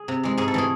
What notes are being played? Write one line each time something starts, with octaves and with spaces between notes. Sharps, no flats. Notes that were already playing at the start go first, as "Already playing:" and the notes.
Already playing: G#4
C3
E3 G#3
G#2 G#4
A4
E3 A3 G#4